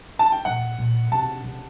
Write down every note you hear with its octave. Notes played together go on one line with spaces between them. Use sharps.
A5
G5
A#2 F#5
A#2
C3 A5
C3